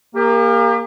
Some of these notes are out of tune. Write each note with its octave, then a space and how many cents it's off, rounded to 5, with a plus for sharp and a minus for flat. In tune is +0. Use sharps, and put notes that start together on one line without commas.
A#3 +0 G4 +40